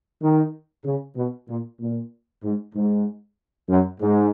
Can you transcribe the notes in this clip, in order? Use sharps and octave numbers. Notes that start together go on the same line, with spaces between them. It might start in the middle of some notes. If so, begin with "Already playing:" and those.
D#3
C#3
B2
A#2
A#2
G#2
G#2
F#2
G#2